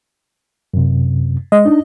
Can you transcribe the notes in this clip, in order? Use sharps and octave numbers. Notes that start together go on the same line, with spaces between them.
F#2 C3
G#3 D#5
D4 D#4